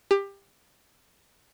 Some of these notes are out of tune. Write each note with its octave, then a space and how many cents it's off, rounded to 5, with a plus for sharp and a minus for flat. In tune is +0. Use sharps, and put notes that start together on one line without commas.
G4 +20